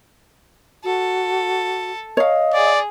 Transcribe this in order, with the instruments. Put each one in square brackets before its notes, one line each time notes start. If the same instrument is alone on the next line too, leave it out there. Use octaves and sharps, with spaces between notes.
[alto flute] F#4 [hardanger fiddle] A4
[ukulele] C#5 F5 [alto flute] D#5
[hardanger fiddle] G#4 [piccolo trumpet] D5